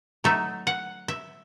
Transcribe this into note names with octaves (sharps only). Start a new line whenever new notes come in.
F#3 A3 D#4 E5
F#5
E5